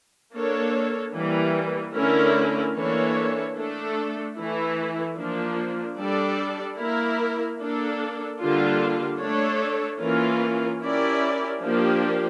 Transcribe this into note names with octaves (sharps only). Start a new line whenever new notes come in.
A#3 D4 A4 C#5
E3 G3 A#3
D3 A3 C#4 E4 A#4
E3 A#3 D4 A4 C#5
A3 D4 A4
E3 A3 E4
F3 A#3 D4
G3 D4 A4 D5
A#3 E4 A#4
A#3 D4 A4
D3 G3 A#3 D4 F4
A3 D4 A4 C#5
E3 A#3 C#4 F4 A#4
C#4 E4 G4 A#4 D5
F3 A#3 D4 G4